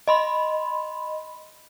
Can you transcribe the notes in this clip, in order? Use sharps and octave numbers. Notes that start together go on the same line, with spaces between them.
D#5 B5 C6